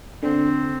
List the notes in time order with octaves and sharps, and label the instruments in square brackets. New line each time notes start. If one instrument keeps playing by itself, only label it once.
[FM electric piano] D3 [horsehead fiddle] C4